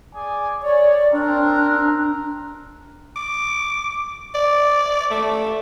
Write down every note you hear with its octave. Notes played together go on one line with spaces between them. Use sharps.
G#4 D5 G#5
C#5 D5
C4 D4 A#4
D6
D5
A3